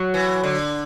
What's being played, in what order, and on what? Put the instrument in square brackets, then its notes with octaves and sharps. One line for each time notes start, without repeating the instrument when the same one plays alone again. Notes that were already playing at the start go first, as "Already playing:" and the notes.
Already playing: [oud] F#3
[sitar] E3
D3